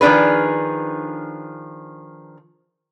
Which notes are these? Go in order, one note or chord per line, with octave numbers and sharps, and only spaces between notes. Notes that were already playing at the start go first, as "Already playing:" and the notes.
D#3 F3 A#3 D4 G#4 B4